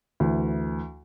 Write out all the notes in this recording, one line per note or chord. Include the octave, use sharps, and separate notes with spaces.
D2 E3